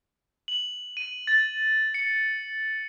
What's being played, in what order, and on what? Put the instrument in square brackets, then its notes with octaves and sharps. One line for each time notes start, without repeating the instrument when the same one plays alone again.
[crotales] F#7
D#7
A6
C#7